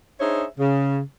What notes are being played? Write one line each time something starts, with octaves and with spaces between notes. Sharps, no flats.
D4 D#4 G#4 C5 C#5 E5
C#3